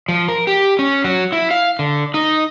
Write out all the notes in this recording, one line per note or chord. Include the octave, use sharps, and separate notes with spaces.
F3
A#4
G4
C#4
F#3
E4
F5
D3
D#4